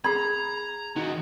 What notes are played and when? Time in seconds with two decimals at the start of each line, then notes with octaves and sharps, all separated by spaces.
0.04 G#4 A#5 B5 G#6
0.96 D#3 D#4 F#4